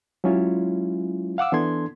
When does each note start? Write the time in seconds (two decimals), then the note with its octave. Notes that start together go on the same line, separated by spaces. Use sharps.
0.24 F#3 G#3 C#4 E4 F4
1.38 F5 F#5 D6 E6
1.52 E3 B3 D4 A4 C6 G#6